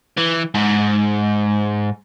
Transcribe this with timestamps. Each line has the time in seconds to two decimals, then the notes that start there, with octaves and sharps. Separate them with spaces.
0.17 E3
0.55 G#2